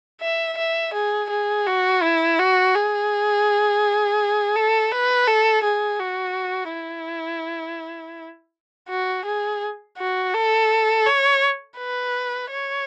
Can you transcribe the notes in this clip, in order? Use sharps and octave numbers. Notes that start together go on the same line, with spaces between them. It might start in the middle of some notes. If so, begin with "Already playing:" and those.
E5
E5
G#4
G#4
F#4
E4
F#4
G#4
A4
B4
A4
G#4
F#4
E4
F#4
G#4
F#4
A4
C#5
B4
C#5